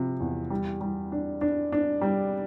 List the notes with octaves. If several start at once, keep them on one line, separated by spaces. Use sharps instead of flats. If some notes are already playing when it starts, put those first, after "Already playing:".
Already playing: C3 F3
E2
G3
G3
D4
D4
D4
G3